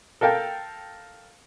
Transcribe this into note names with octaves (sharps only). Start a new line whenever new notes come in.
A4 A#4 F5 G5